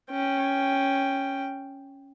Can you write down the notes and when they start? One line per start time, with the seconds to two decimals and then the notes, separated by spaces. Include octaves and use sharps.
0.11 C#4 G5